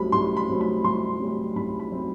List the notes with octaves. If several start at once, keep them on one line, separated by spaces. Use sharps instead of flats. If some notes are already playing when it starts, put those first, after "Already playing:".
Already playing: C2 C3 F#3 A3 C4 B5
C2 C6
B5
C3 F#3 A3 C4
B5
C2 C6
C3 F#3 A3 C4
C2 B5
B5
C3 F#3 A3 C4